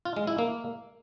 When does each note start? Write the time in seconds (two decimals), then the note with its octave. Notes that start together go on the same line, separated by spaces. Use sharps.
0.05 F4
0.16 G#3
0.27 E4
0.38 A#3